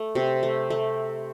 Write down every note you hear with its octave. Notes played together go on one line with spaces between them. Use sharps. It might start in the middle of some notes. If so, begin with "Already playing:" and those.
Already playing: A3
C3
A3
A3